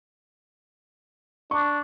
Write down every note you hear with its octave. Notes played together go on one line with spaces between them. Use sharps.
D4 C#6